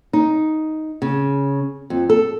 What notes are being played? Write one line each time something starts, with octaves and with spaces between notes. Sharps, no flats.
D#4
C#3
F2
A4